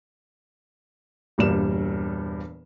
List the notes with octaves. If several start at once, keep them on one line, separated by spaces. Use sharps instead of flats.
E1 G2 A#2 G3 E7